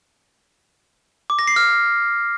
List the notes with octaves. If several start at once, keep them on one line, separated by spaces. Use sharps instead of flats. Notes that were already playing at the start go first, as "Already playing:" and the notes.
D6
A#6
C7
F6